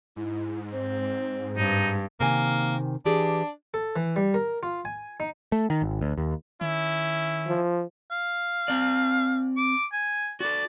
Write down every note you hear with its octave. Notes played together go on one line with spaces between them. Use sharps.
G#2 E4
C4 C5
G2 D#4
C3 D#3 A#3 G#5
E3 D4 G4 G#4
A4
E3
G3
A#4
F4
G#5
D#4
A3
D#3
G#1
D2
D#2
D#3 C#4 E4
F3
F5
C4 D5
D6
G#5
F#4 A4 D5